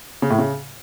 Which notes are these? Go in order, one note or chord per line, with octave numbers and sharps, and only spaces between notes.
C#3
A2
C#3